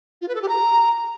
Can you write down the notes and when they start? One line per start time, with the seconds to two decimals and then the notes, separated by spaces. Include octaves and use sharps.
0.22 F4
0.28 B4
0.35 A4
0.42 G4
0.49 A#5